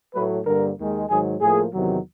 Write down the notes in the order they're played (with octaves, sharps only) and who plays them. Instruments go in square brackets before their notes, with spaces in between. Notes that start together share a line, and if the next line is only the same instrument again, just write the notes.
[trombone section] A2 F#3 A3 B4
G2 D3 G3 A#3 A#4
D#2 D#3 G#3
G#2 D#3 F#3 G#4
A2 F3 A#3 G#4
E2 C3 D#3 F#3